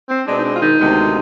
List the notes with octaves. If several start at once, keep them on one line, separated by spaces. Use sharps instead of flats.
C4
B2 G#3 C4 D4
D#4
D4
F4
D#3 D#4
D2 C3 D#3 G#3 B3